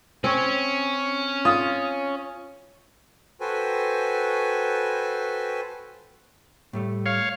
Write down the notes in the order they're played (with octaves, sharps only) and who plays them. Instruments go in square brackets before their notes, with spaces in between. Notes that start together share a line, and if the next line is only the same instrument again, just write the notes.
[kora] C4 C#5 [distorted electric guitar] C#4
[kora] F4 [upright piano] D#6
[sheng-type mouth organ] F#4 A4 B4 C5 G5 G#5
[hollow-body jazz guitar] A2 G3 A3
[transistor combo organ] C#5 F5